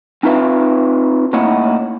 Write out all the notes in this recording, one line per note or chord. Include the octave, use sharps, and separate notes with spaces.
C4 D#4 F4 B4 E5 F5
A2 A#3 C#4 D#4 E4 F#5